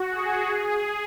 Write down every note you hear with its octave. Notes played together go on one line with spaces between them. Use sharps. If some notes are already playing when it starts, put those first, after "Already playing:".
Already playing: F#4
G#4
G#4